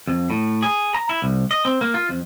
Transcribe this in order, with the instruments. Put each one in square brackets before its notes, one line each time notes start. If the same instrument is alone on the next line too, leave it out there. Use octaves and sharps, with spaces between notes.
[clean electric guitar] F2
A2
G#4
A#5
E4
C2
D#5
C4
A#3
F4
F2